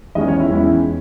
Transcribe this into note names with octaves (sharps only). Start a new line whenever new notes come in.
E2 D#3 G#3 C#4 D#5
C#5
E4
E2 D#3 G#3 C#4 E4